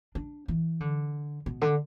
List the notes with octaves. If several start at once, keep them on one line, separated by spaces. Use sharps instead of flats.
D4
E3
D3
B2
D3